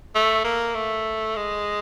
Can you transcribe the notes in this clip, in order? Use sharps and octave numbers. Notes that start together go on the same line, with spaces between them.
A3
A#3
A3
G#3